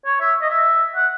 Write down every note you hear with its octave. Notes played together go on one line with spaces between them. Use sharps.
C#5
E5
D#5
E5
F#5